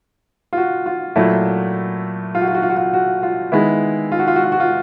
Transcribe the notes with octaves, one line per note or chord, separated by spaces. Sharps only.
F4
F#4
F4
A#2 F#3 A3 E4
F4
F#4
F4
F#4
F4
F#4
F4
F#4
F4
D#3 G#3 B3 E4
F4
F#4
F4
F#4
F4
F#4
F4